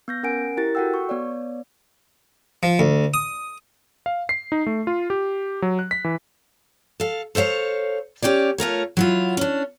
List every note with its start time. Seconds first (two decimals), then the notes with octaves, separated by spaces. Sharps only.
0.08 B3 G6 A#6
0.23 C#4 A#4 F#5 G#5 D7
0.57 E4 G4 A#4 A6
0.75 F#4 A4 F#5 G5 E6
0.94 C#6
1.09 B3 C#5 D5
2.63 F3
2.79 D2
3.14 D#6
4.06 F5
4.29 C7
4.52 D#4
4.66 A3
4.87 F4
5.10 G4
5.62 F#3
5.79 F#6
5.91 B6
6.04 E3
7.00 A4 F5
7.35 A4 C5 C#5 E5 F5
8.22 C#4 G4 C#5 D5
8.58 A3 F4 A#4 C#5
8.97 F#3 E4 F4
9.37 C#4 D4